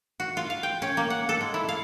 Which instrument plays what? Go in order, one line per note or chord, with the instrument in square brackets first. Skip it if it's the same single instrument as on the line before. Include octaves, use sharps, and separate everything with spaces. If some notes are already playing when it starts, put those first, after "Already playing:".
[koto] F#4
F4
F5
G5
C#4
A#3
F#5
A4
G#3
E4
F5